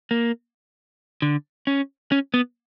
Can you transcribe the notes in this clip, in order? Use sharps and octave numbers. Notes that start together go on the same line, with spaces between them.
A#3
D3
C#4
C#4
B3